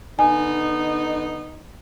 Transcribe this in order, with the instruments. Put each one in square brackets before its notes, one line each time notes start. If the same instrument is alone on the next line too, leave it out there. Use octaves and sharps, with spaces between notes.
[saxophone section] D3 B3 D#4 [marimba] G#5